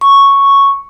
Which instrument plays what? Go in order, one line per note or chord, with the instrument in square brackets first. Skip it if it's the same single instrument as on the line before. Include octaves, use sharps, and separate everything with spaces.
[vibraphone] C#6